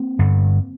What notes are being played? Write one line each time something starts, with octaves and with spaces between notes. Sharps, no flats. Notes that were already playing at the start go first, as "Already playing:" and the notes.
Already playing: A#3 C4
G2 D3